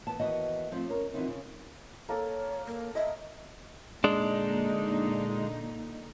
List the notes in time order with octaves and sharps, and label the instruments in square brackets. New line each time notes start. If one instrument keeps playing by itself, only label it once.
[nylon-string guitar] E3 B3 A5
D#2 E3 B3 F#4 D#5
F3 A3 C4
C#4 A#4
D3 E3 F3 C4 D#4
C#3
[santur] A#3 A4 [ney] C#5
[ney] A#3
[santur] D#5 [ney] E5
[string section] A#2 D3 D#4 [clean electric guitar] G#3 D4